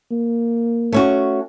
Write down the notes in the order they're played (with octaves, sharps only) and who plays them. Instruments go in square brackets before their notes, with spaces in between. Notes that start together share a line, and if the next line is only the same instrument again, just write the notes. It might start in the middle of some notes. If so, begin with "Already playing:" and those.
[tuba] A#3
[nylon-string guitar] A3 C#4 F#4